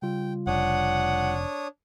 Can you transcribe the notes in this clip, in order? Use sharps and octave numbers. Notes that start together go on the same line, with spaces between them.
C#3 G3 F4 G5
F1 D4 C#5 F#5 D#6